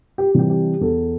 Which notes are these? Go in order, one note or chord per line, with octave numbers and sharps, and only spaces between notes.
G4
C3 E3 G3 G4
G4
E2 A4